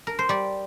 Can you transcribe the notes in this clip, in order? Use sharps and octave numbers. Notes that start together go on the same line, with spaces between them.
A#4
C5
G3 D5